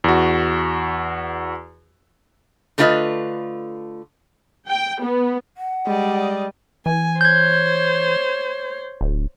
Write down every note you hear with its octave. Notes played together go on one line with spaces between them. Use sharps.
E2 F#4
D3 A3 D4 F4 B4 D#5
G5
B3
F#5
G3 G#3 D5 D#5
E3 G#5
C5 C#5 G6 G#6
D1